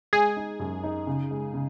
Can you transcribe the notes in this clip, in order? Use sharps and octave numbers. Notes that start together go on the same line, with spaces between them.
G#3 G#4
D#4
F#2
D#4
C#3
G#3
C#3